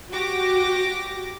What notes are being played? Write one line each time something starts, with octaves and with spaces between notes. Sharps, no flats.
F#4 G4 D6 A#6